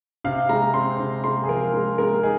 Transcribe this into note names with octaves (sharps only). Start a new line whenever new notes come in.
C3 F5
G#3 A#5
C4 C6
C3
G#3 C6
G#4
F3 A#4
G#3 G#4
G#3 A#4
D#4 G#4